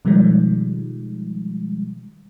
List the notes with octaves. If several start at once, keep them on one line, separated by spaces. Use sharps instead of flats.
B2 D#3 F3 G3 G#3